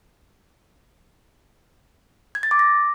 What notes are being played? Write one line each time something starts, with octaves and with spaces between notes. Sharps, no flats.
G#6
A6
D6
A#6